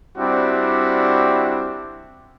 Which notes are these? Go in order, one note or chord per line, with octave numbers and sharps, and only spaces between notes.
G3 C4 D4 E4 F#4